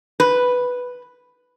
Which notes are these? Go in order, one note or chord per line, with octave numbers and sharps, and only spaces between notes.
B4